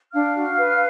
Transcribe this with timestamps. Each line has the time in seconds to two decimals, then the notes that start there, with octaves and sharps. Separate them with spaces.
0.13 D4 F5 F6
0.36 F#4
0.57 B4